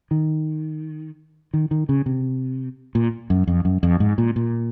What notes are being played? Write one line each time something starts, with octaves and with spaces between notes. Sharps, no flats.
D#3
D#3
D#3
C#3
C3
A#2
F#2
F2
F#2
F2
G#2
A#2
A#2